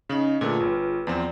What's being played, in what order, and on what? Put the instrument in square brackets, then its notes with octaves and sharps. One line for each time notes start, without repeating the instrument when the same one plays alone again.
[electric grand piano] C#3 [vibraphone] C#4 D#4 D#5
[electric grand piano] A#2 D3 A3 [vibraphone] F4 G#4 B4
[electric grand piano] G1
[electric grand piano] E2 F3 C4 [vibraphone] D5